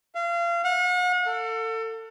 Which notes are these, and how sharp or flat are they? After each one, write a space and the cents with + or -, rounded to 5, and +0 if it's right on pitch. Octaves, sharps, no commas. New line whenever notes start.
F5 -30
F#5 -40
A4 +30